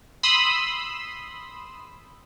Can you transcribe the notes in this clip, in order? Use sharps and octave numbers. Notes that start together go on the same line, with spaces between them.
B5 C6 D#6 E6